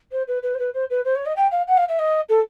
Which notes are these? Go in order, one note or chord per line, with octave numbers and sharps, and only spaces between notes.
C5
B4
B4
C5
B4
C5
B4
C5
C#5
D#5
G5
F5
F#5
F5
E5
D#5
A4